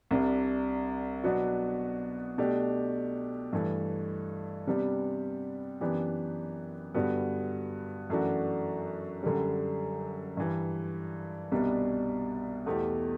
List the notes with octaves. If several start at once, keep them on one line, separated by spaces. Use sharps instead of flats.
C2 C3 G3 D4
B2 F#3 B3 D4 F#4
B2 A3 D4 G4
G2 E3 A3
C3 G3 B3 D4 G4
F#2 E3 B3 D4 G4
G2 D3 G3 B3 F#4
F#2 E3 A3 D4 F#4
F#2 D3 G3
G2 E3 G3
C2 B2 G3 B3 D4
E2 B2 A3 E4 G4